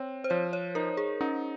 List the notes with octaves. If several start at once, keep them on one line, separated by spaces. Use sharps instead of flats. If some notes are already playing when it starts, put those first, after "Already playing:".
Already playing: C4 C#5
C5
F3 C#5
C#5
D#4 A#4
G#4
C#4 D#4